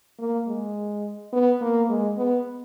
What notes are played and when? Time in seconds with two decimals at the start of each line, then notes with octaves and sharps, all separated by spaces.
0.19 A#3
0.48 G#3
1.33 B3
1.61 A#3
1.89 G#3
2.17 B3